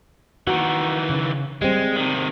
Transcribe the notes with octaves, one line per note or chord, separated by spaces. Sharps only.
D#3 E3 A#3 F#4
C#3
G3 G#3 C4
C3 D#3